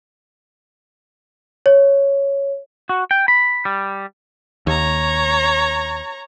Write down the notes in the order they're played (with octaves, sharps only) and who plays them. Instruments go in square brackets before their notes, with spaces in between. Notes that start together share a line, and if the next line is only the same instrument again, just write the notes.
[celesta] C#5
[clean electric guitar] F#4
G5
B5
G3
[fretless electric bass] D#2 [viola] C#5 A#5